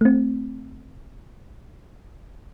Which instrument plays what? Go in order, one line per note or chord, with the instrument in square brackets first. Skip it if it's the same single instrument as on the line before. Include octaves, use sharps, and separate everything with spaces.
[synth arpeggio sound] A3 C4